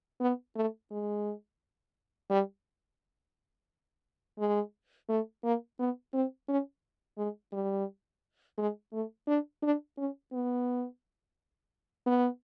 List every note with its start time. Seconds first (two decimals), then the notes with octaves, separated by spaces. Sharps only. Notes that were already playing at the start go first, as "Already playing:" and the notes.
0.21 B3
0.56 A3
0.91 G#3
2.30 G3
4.39 G#3
5.09 A3
5.44 A#3
5.79 B3
6.13 C4
6.49 C#4
7.18 G#3
7.53 G3
8.58 G#3
8.93 A3
9.27 D4
9.63 D4
9.97 C#4
10.33 B3
12.06 B3